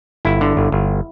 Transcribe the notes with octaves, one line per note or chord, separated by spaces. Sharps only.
G1 E4
D3
G1
G1